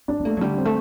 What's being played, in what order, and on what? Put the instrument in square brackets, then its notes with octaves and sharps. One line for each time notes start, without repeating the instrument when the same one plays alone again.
[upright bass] C4 [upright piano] D4
[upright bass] C4
[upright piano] A3 [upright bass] A#3
[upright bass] F#3
[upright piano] D3 [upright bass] G3
[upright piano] C4
[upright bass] A3